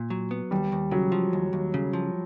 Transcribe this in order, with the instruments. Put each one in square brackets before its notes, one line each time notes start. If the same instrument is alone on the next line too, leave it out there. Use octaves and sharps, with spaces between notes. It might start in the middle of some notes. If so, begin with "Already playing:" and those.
Already playing: [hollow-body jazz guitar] A#2
F#3
B3
[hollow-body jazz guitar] D#2 [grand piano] G3
[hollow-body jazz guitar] D#2
[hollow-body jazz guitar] C#3 [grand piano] F#3
[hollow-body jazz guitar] F3
D#2
D#2
C#3
F3